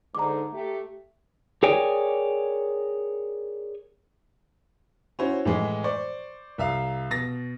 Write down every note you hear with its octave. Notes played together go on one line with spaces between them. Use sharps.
G#2 D3 A#5 D6
A3 G4
G#4 A#4 C#5 D5 G5 G#5
C#4 E4 F#4 C5 C#5
A2 E3 G#3
C5 D5 C#6
C2 E5 F5
B2 A6 A#6